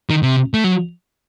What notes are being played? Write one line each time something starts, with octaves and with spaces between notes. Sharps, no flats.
D#3
C3
A3
F#3